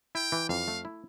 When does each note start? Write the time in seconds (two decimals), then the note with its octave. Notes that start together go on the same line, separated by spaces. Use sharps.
0.15 E4 G5
0.32 E3
0.49 F2 F5
0.68 A3
0.85 E4